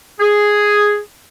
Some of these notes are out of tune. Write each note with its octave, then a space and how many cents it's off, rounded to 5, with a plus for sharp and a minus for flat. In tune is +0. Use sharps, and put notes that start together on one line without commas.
G#4 +0